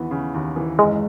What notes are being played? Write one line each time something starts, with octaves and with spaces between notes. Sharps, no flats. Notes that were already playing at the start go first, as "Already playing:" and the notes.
Already playing: D#2 E3 B3
C#3
D#2
E3
F#1 G#3